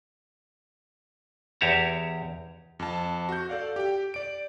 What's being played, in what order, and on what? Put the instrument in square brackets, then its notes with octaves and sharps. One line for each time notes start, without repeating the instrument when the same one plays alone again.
[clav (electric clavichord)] E2 G4 C#5 A5 A#5
[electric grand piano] F2 A5
F#4 G6
A4 D5 F5
G4 G5
D5 D7